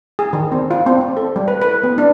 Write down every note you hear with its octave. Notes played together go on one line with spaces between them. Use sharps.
G#4
D#3
C4
F4
C4
C4
A4
G3
B4
B4
B3
D4